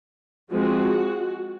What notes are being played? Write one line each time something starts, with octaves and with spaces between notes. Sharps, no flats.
F3 G#3 C4 F#4